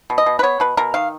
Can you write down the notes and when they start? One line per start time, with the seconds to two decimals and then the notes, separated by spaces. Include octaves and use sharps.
0.10 B2
0.18 D#5
0.26 B2
0.39 B4
0.43 B3 C#5
0.60 B2 B4
0.77 B2 A#4
0.94 D#3 F5